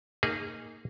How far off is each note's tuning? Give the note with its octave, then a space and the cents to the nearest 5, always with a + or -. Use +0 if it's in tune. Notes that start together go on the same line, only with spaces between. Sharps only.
A#3 -20 D#4 +0 G#4 -20